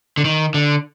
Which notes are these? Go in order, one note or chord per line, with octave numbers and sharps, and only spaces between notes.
D3
D#3
D3